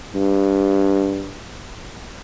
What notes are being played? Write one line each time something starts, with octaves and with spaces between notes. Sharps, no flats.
G2